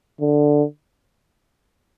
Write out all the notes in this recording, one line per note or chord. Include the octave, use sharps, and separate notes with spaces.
D3